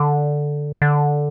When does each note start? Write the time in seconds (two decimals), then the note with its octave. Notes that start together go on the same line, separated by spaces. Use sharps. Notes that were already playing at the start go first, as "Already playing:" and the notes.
Already playing: D3
0.82 D3